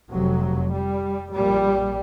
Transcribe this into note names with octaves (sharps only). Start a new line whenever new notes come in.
F1 F2 C3 F#3
G3
A#1 A#2 G3